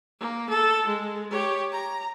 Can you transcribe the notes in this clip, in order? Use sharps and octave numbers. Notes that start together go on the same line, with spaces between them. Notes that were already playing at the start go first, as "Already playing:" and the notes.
A#3
A4
G#3
G4 C#5
A#5